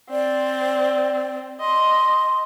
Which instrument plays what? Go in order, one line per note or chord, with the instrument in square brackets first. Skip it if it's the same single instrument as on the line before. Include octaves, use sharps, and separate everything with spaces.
[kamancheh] C4 [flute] D5
[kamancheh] D#5 [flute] C6